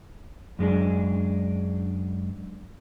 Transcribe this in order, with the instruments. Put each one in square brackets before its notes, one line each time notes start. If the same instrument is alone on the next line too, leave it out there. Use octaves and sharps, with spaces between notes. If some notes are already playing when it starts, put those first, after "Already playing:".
[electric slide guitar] F#2 G#3 D4 G#4